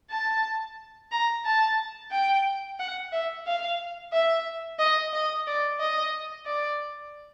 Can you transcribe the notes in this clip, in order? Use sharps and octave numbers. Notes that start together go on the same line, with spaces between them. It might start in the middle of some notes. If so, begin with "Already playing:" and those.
A5
A#5
A5
G5
F#5
E5
F5
E5
D#5
D#5
D5
D#5
D5